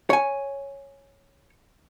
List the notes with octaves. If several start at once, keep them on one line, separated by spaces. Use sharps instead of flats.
C#5 G#5